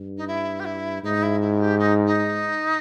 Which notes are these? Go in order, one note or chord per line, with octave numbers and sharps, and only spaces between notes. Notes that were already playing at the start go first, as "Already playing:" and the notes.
Already playing: G2
D#4
E4
G4
E4
G#2 D#4
E4
E4
G4
D#4
D#4